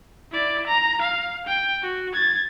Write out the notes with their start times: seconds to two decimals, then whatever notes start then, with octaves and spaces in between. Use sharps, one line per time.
0.31 E4 D5
0.67 A#5
1.02 F5
1.47 G5
1.82 F#4
2.13 G#6 A6